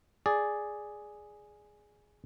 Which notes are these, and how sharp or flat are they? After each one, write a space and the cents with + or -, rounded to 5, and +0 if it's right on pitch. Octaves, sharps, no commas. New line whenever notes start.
G#4 +0 D5 +0